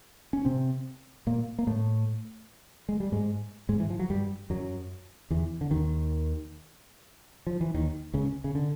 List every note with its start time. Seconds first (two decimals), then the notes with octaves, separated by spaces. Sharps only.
0.33 C#4
0.45 C3 C4
1.27 A#2 A#3
1.59 A#3
1.67 A2 A3
2.89 G#3
3.00 G3
3.12 G#2 G#3
3.69 G#2 G#3
3.80 E3
3.90 F3
3.99 F#3
4.10 G2 G3
4.50 F#2 F#3
5.30 E2 E3
5.61 D3
5.71 D#2 D#3
7.47 F3
7.61 E3
7.74 D#2 D#3
8.14 C#2 C#3
8.44 C#3
8.55 D3